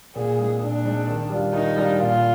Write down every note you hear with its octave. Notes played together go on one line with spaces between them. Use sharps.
A#2 G#4
G#3 C4 D#4
A#2 D4
G#3 C4 D#4
D#3
G3 D4 F4
D#3 D#4
G3 D4 F4
A#2 F4